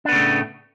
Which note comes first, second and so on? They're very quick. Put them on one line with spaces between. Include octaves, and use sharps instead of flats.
D4 B3 C#3 A3 A2